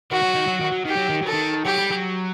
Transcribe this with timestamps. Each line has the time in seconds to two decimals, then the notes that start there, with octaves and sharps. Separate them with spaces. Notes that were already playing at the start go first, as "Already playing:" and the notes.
0.11 D#3 F#4
0.23 F#3
0.35 D#3
0.47 F#3
0.61 D#3
0.72 F#3
0.85 D#3 G4
0.97 F#3
1.09 D#3
1.22 F#3 A4
1.33 D#3
1.65 F#3 G4
1.78 G3
1.90 F#3